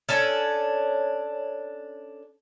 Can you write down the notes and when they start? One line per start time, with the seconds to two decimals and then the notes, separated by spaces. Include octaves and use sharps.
0.09 C#4 D4 A4